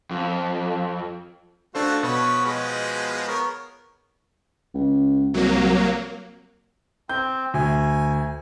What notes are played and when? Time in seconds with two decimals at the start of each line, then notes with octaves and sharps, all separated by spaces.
0.11 F2
1.75 A3 D4 F4 F#4 A4 C5
2.03 B2 F3 B4 C#5
2.45 F3 G#3 B4
3.28 B3 A#4 C#5
4.74 C#2
5.34 C2 F#3 A#3
7.09 C4 G6
7.54 D2 G#5